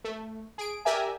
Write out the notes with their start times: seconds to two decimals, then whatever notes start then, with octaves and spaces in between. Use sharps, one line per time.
0.04 A3
0.58 G#4 D7
0.85 G4 A#4 D5 E5 G#5